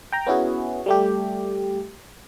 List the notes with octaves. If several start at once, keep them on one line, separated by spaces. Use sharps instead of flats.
G5 A#5
B3 C#4 E4 F#4 G#4
G3 A3 G4